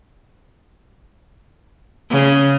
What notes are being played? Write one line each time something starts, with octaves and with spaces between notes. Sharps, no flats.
C#3